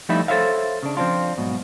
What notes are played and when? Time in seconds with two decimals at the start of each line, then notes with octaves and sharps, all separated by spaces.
0.09 F3 G3 A3 D#4 E4 E5
0.28 A4 C5 C#5 E5 F5
0.83 C#3 D4
0.97 F3 F#3 C4 D4 F4
1.38 B1 G#2 B2